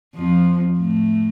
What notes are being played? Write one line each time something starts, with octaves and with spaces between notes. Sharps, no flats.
F2 F3
A2 A3